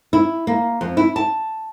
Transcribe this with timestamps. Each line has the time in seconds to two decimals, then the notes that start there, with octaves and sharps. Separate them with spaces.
0.13 E4
0.47 A#3
0.81 F2
0.97 E4
1.16 A5